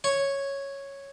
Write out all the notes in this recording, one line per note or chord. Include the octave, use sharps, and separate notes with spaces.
C#5 C#6